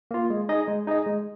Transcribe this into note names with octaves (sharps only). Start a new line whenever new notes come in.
A#3 F4
G#3
D#4 G#4 D#5
G#3
D#4 G#4 D#5
G#3